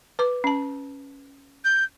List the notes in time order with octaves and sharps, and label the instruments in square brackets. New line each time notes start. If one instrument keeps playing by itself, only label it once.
[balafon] B4 D6
C#4 A5
[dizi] G6